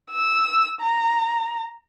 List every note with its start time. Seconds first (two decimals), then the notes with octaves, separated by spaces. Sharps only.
0.11 E6
0.81 A#5